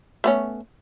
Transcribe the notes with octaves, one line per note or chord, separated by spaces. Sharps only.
A3 B3 C#4